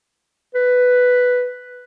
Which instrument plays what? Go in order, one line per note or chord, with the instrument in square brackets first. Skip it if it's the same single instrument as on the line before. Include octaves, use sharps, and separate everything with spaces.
[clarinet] B4